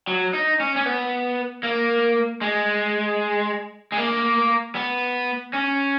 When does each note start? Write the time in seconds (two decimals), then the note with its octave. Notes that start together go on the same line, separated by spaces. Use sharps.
0.07 F#3
0.33 D#4
0.60 C#4
0.76 C#4
0.85 B3
1.63 A#3
2.41 G#3
3.92 G#3
3.97 A#3
4.75 B3
5.53 C#4